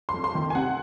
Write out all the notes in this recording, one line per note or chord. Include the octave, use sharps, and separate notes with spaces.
C6
F2
C6
D#3
G#5
C3 F#5